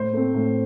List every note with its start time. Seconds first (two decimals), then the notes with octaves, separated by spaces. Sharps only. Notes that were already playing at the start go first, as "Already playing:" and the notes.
Already playing: A2 C5
0.13 A3 C4
0.34 A2